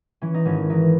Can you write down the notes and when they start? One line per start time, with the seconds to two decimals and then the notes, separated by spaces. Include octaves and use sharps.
0.22 E3 C#4
0.34 D#4
0.45 G#1 C#4
0.69 E3 D#4